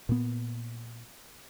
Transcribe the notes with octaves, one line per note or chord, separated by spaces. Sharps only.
A#2 B3